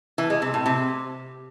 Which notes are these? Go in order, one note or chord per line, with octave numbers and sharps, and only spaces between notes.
E3
G#3
C3
A2
C3